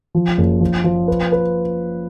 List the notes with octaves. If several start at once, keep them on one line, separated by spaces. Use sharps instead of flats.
F3
F#1
F3
F3
B4
B4